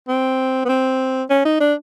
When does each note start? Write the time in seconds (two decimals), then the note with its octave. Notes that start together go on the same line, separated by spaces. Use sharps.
0.08 C4
0.65 B3
0.69 C4
1.30 C#4
1.45 D#4
1.60 D4